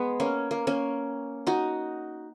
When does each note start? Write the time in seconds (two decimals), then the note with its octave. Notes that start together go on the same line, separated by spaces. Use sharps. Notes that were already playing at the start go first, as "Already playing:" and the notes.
Already playing: G#3 B3
0.20 A#3 C#4
0.51 A#3
0.67 A#3 C#4
1.47 D#4 F#4